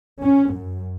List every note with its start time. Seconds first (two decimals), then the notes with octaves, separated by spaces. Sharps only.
0.20 C#4
0.51 F#2